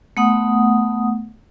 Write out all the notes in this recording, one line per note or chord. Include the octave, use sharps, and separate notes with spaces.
A3 B3 F#5 D#6